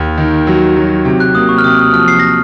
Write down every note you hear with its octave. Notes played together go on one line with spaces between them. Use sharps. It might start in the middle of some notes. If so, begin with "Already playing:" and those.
Already playing: D#2
D#3
F#3
F#3
C3
F#6
A#3 D#6
C#6
F6
C3 D#6
D#6
F3 F6
C7
A#6